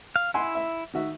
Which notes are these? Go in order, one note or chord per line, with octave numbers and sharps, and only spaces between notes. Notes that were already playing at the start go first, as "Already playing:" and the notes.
F5
E4 F#5 G#5 C6
E5
D#3 F#4 E5